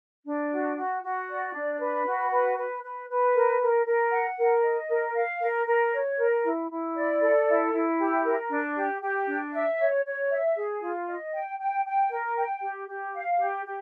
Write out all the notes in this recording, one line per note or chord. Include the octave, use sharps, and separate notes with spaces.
D4
F#4
F#4
F#4
D5
D4
B4
F#4
B4
B4
B4
B4
A#4
A#4
A#4
F#5
A#4
D#5
A#4
F5
A#4
A#4
C#5
A#4
E4
E4
D5
A4
E4
E4
G4
A#4
D4
G4
G4
D4
E5
C#5
C#5
E5
G#4
F4
D#5
G5
G5
G5
A#4
G5
G4
G4
F5
G4
G4